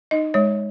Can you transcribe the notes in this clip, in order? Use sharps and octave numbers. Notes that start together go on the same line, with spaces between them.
D#4 D#5
G#3 C#5